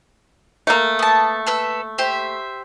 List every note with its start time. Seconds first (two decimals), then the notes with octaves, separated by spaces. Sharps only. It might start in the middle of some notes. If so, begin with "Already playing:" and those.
0.67 A3 A#3
0.99 B3 A5
1.47 A4 B4 E6
1.98 G4 C5 E5